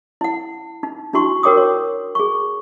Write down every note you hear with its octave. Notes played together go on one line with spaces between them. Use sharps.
E4 F#5
D#4
D4 E4 F#4 C6 C#6
F#4 A#4 C#5 G5 D6 D#6
C#5
G#4 C#6